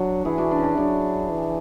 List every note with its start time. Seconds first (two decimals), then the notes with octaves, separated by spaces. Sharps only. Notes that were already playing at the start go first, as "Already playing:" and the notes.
Already playing: F#3 D4 F#4
0.25 E3 E4 G#4
0.38 D4 F#4
0.51 D4
0.58 C#4
0.64 D4
0.78 F#3 D4
1.30 E3